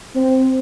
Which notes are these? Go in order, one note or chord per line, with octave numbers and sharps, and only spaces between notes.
C4